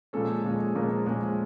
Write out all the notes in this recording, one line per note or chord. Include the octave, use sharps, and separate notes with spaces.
A#2 F3 G#3 C#4 A4
A#2 F3 G#3 C#4
A#2 F3 G#3 C#4 A#4
A#2 F3 G#3 C#4